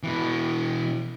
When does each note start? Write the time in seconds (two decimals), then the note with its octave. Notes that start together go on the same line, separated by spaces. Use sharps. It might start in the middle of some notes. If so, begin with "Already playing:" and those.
0.03 B2 E3